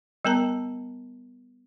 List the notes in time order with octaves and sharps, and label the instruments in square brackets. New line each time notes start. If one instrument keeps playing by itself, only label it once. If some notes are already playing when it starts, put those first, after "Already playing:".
[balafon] G3 B3 A#4 A5 A#5